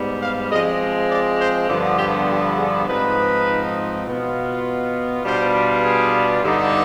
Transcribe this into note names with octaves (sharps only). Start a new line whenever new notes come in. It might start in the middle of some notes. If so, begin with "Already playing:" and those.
Already playing: G#2 G3 B3
F5
F3 G#3 C4 D#5
D5
C5
G2 D3 F3 B3
G4
G4
G#4
G#2 F3 C4 D#4 B4
B2 B3 F4
B2 G3 B3 D4 F4 C5
G#4
G2 D3 G3 B3 D#4